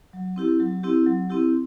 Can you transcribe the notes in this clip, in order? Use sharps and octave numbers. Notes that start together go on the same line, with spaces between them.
F#3
C4 E4 G4
F#3
C4 E4 G4
F#3
C4 E4 G4